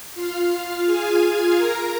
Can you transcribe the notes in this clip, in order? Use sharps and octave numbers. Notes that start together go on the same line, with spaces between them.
F4 F5
G#4 G#5
A#4 A#5